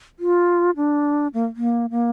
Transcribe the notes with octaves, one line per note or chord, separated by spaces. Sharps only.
F4
D4
A#3
A#3
A#3